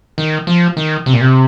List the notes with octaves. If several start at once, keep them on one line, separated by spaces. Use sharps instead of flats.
D#3
F3
D#3
C3
A#2
C3